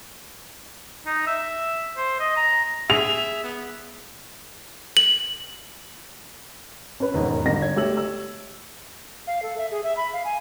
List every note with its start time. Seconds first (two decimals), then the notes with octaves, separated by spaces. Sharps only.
1.07 D#4
1.27 E5
1.97 C5
2.20 D#5
2.36 A#5
2.90 G#4 E5 F7
3.44 B3
4.97 F#7
7.00 C#4 B4
7.14 E1 D#2 G#2
7.46 G1 A#6
7.62 C#5 G#6
7.76 A3 G4 C#5 E6 F#7
7.97 E6
9.27 F5
9.42 A4
9.58 E5
9.71 G#4
9.84 E5
9.97 B5
10.13 F5
10.25 G#5